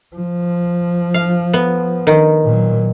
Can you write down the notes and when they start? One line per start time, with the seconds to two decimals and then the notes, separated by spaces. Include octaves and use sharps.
0.17 F3
1.14 F5
1.54 B3
2.07 D#3
2.45 A#2 F#3